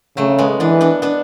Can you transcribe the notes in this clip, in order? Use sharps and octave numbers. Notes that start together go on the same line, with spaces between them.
C#3 F#3 A3
G#3 B3
E3 B3 D4
B3 D4
B3 D4